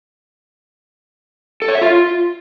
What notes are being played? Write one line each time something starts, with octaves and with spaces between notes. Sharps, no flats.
A4
C#5
E5
F4